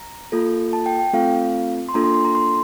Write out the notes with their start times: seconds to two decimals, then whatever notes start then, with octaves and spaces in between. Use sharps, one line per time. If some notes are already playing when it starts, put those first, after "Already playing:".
Already playing: A#5
0.32 A#3 F4 A4
0.73 A5
0.86 G5
0.99 G5
1.13 A3 C4 F4 A4 F5
1.89 C6
1.94 A#3 D4 F4 A4 A#5
2.04 C6
2.14 C6
2.25 A#5
2.35 C6